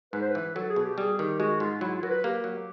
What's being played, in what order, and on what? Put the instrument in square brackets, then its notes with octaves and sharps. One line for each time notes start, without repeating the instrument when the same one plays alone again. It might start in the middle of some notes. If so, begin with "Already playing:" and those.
[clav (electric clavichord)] G#2 [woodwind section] B4
[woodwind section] C5
B4
[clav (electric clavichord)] E3
[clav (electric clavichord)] F#3 [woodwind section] A4
[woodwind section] G#4
[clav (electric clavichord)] B2
[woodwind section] G4
[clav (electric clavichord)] G3 [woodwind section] G#4
[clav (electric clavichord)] D#3 [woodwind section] G4
[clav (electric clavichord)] G#3 [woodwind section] F#4
[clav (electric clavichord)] G#2 [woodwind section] F4
[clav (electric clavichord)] F#3 [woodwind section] E4
[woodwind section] F4
[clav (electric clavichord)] F#3 [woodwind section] A#4
[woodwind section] B4
[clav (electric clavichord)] A#3 [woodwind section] G4
[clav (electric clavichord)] F#3